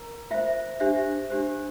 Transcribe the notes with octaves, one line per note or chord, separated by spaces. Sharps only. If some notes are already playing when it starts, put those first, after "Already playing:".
Already playing: A#4 A#5
F4 C5 E5
D4 G4 C5 E5
D4 G4 C5